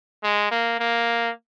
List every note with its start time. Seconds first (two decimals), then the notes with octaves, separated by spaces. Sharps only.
0.23 G#3
0.51 A#3
0.80 A#3